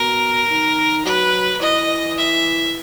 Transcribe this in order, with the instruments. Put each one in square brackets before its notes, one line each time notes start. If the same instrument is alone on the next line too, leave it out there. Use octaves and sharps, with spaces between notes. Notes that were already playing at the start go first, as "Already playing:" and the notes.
Already playing: [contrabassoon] B2 [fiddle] A#4
[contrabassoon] D#3
[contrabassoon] F#3 [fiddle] B4
[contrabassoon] E3 [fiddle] D#5
[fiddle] E5